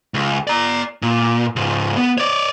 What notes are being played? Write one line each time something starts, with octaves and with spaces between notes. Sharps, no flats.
C#2
D5 A#5
A#2
C#2 G#2
B3
C#5 D5